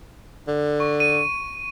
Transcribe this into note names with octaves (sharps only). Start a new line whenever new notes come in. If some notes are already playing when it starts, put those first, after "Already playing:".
D3
C#6
D#7